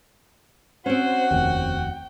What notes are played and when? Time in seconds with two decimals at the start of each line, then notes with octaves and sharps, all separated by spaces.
0.86 C4 C#4 F#4 C5 F#5
1.31 F1 D#2 G5